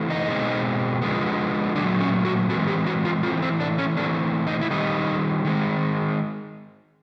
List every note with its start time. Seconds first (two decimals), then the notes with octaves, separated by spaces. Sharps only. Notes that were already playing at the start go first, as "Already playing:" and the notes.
Already playing: E3 A3 C4
0.10 D#4
0.28 B2 G#3 C4
1.02 D3 F3 G#3 B3
1.75 A#2 F#3 A3 D4
2.01 C#4
2.25 F#4
2.49 E3 G#3 C4 F#4
2.68 G4
2.86 F#4
3.05 F4
3.23 E3 A3 C4 F4
3.42 C4
3.60 D4
3.78 C#4
3.97 E3 A3 C4 D4
4.47 D#4
4.61 E4
4.71 D#3 G3 C4 D#4
5.45 D#3 G#3 C4